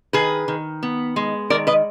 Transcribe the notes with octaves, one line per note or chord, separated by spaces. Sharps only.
D#3 G#4 B4
D#3
B3
G#3
D#3 A#4 D5
B4 D#5